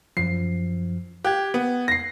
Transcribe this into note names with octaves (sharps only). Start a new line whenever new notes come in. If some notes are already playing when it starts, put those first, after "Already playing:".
F#2 F3 C7
G4 F#6 G#6
B3
A#6 C7